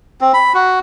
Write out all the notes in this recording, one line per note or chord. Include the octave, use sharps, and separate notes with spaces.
C4
B5
F#4